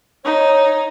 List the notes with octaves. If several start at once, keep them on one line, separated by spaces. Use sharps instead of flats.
D#4 C#5